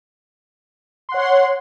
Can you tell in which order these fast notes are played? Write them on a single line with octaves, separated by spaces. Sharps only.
C6 F#5 C#5